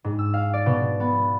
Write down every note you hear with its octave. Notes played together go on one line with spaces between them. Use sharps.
G#2
E6
F5
D5
B2
B3